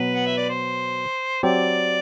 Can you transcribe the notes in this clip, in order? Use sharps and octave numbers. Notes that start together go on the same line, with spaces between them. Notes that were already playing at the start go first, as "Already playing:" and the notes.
Already playing: B2 F#3 B3 B4
F#5
E5
D5
C5
F#3 C4 G4 D5